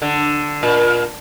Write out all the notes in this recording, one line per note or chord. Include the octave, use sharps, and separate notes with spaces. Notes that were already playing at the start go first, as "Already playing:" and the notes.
D3
A#2